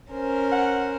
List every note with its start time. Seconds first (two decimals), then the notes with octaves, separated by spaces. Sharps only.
0.12 C#4 A#4 C5
0.52 F#5